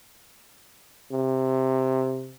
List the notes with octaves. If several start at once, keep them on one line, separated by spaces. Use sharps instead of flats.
C3